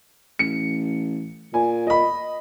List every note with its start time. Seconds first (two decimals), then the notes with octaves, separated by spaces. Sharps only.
0.39 A1 C#7
1.54 A#2 G#5
1.87 D#5 B5